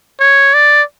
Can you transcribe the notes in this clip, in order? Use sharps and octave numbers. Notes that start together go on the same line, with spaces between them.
C#5
D5